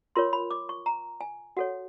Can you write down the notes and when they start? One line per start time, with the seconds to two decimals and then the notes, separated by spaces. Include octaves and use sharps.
0.16 F4 A#4 C#5 C6
0.33 B5
0.51 D6
0.69 C#6
0.86 A#5
1.21 G#5
1.57 F#4 A4 C#5 F#5